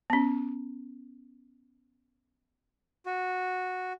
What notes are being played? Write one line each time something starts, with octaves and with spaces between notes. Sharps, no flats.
B3 C#4
F#4